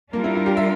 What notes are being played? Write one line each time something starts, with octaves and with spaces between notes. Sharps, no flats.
G3 A#3 D4 F4 A#4
E4
E4
G4
E5